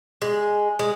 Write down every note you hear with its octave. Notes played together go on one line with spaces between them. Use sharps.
G#3
G#3